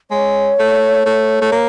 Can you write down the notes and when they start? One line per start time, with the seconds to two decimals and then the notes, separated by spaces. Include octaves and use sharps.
0.11 G#3 C#5
0.59 A3
1.06 A3
1.41 A3
1.52 A#3